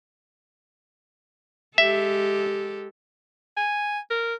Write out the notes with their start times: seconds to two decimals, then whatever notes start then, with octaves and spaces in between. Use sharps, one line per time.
1.78 G#3 G4 A4 E5
3.57 G#5
4.10 A#4